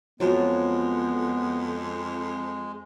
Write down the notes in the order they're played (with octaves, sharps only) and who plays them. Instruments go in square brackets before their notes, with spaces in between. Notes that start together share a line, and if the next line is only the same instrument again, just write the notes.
[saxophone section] F2 [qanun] F3 F#3 [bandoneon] G#3 [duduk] B3